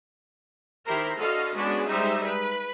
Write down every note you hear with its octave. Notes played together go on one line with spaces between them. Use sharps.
D#3 E4 G4 A#4 C5 A#5
D3 F#4 A4 D#5 F5
G#3 B3 C#4 D4 F#4 G#4
G3 G#3 D#4 C5 E5
B4